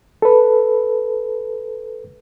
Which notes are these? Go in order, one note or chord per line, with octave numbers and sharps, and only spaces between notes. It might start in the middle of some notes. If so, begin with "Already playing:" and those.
A4 B4